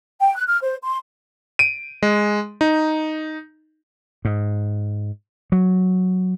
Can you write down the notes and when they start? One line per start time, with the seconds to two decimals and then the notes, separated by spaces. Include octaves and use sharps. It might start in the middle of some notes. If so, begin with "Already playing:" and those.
0.20 G5
0.35 F#6
0.47 F6
0.62 C5
0.83 C6
1.59 D7 D#7
2.03 G#3
2.61 D#4
4.25 G#2
5.52 F#3